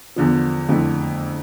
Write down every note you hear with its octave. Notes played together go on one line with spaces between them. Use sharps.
E2 D3 F3
F2 D3 A3 E4